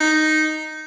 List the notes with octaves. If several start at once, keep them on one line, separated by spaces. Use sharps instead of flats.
D#4